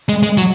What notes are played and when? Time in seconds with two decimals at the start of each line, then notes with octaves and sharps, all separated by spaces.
0.09 G#3
0.23 G#3
0.37 F#3